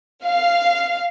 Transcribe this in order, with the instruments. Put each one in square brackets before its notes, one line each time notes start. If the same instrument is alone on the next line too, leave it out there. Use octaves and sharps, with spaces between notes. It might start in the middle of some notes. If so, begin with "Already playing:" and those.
[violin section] F5